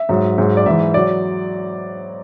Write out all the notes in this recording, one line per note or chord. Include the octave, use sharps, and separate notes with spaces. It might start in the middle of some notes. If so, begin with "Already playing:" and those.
Already playing: E5
G#2 F#3
G#2 F#3
D5
G#2 E3 E5
F#3 D5